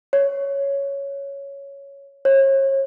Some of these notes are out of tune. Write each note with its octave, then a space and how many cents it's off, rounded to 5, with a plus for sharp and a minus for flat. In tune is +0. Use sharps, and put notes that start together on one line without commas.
C#5 +5
C#5 -40